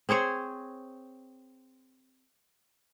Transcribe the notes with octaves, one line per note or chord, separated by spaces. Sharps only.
C4 G#4 C5 C#5